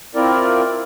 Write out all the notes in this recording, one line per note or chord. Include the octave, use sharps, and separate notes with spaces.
C4 E4 F4 A#4 D5